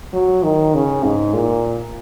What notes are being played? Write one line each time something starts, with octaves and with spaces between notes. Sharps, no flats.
F#3
D#3
C#3
G#2
A#2